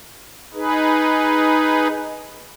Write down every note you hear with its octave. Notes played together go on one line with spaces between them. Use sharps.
D#4 G#4 B4